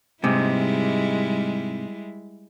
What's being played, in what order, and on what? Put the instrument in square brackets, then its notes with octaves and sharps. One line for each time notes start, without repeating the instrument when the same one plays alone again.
[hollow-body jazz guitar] G#2 C3 [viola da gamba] G3 G#3 E4